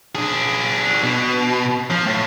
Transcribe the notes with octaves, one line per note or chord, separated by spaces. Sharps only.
D4 G#4
B2
F3
A2